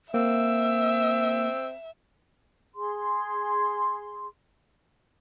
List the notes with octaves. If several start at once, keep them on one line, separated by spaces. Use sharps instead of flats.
A#3 C4 E5 E6
G#4 C6